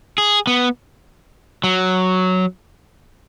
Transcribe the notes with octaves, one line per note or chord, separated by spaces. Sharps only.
G#4
B3
F#3